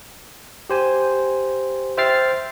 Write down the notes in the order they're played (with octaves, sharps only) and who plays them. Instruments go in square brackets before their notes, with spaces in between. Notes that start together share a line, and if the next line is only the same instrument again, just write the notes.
[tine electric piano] G4 C5 G#5
C5 E5 G5 F6 A6 C7